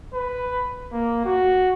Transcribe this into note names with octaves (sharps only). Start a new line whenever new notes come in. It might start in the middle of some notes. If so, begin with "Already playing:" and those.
B4
A#3
F#4